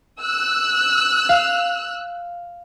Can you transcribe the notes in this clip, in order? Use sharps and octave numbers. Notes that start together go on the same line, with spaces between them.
E6 F#6
F5